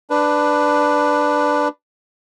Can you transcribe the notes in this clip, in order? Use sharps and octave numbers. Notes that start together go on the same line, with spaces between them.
D4 B4